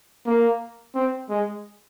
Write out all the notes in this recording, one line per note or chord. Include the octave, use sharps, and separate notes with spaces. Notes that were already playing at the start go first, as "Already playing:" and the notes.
A#3
C4
G#3